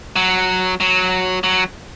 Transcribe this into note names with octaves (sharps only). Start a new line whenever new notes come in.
F#3
F#3
F#3